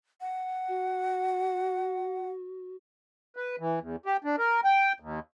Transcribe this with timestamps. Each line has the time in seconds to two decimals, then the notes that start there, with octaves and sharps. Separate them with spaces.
0.21 F#5
0.68 F#4
3.36 B4
3.59 E3
3.80 E2
4.06 G4
4.24 D4
4.38 A#4
4.64 G5
5.00 D#2